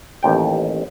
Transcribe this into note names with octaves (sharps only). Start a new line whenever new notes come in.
A1 D#2 G5